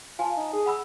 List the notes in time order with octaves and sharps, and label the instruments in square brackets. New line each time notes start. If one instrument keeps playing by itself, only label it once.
[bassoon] F4 [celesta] G#5 A5
[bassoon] D#4
G#4
[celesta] F#5 B5 E6